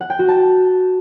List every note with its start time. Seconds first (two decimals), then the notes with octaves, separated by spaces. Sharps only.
0.01 F#5
0.10 G5
0.19 F#4
0.28 A5